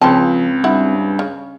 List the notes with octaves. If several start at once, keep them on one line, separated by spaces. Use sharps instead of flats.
C#2 C#3 F3 C4 C5 G5 A5
G2 E4 F#5
C#3